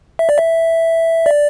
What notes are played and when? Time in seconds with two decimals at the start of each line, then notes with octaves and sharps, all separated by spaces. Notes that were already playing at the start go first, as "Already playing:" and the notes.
0.19 E5
0.29 D5
0.38 E5
1.26 D5